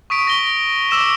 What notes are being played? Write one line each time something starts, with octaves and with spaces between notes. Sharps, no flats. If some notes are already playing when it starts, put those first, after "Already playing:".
C#6 D#6 B6 D7
A#6 G7
D6 E6 E7